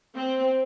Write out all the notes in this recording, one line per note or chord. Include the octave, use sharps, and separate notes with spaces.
C4